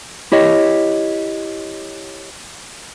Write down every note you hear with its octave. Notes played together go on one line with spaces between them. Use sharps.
E4 G4 C#5 D#5